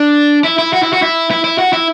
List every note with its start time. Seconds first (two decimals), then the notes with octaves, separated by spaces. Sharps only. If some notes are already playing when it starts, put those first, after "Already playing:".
Already playing: D4
0.44 E4
0.59 E4
0.73 F#4
0.83 E4
0.93 F#4
1.02 E4
1.31 E4
1.44 E4
1.59 F#4
1.73 E4